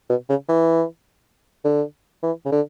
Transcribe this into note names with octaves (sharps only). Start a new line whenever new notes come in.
B2
C#3
E3
D3
E3
C#3
D3